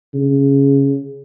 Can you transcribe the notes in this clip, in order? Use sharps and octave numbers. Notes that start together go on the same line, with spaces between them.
C#3